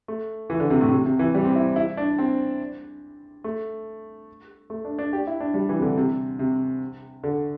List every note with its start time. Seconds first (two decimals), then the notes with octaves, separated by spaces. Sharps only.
0.08 A3
0.50 E3
0.60 D3
0.70 C3
0.81 A2
0.92 C3
1.06 C3
1.19 E3
1.35 G3
1.45 C4
1.56 E4
1.76 E4
1.97 D4
2.19 C4
3.44 A3
4.70 A3
4.85 D4
4.99 D4
5.13 G4
5.27 E4
5.40 D4
5.54 G3
5.69 E3
5.79 C3
5.82 D3
5.97 C3
6.39 C3
7.24 D3